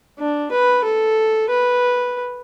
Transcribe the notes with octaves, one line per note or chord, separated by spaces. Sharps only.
D4
B4
A4
B4